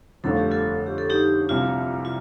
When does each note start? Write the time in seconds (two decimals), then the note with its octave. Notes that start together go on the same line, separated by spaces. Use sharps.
0.24 G1 F2 D3 F3 A3 A4
0.37 G4
0.51 F4 A4
0.87 G4
0.98 A4
1.10 D#4 G4
1.49 C2 C3 F3 C4 F4
2.05 F4